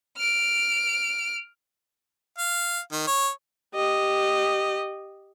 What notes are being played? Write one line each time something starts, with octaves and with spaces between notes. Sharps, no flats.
F6 D7
F5
D#3
C#5
G4 D#5